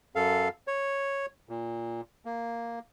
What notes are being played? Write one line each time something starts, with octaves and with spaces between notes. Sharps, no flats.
F#2 A4 F5
C#5
A#2
A#3